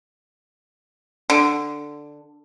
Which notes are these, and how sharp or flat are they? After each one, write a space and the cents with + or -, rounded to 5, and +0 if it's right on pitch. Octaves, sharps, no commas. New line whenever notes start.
D3 +5